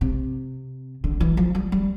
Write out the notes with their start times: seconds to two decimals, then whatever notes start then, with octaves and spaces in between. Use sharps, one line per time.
0.01 C3
1.04 D3
1.20 E3
1.37 F3
1.55 G3
1.72 G3